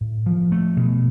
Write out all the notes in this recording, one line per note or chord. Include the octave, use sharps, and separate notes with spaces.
A2
F3
A3
B2